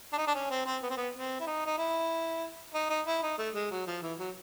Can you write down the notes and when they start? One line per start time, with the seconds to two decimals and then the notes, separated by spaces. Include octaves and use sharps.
0.13 D4
0.18 D#4
0.28 D4
0.35 C#4
0.51 C4
0.66 C4
0.83 B3
0.90 C4
0.97 B3
1.15 C4
1.40 E4
1.47 D#4
1.66 D#4
1.78 E4
2.74 D#4
2.90 D#4
3.07 E4
3.23 D#4
3.38 A3
3.55 G#3
3.71 F#3
3.87 F3
4.02 E3
4.19 F#3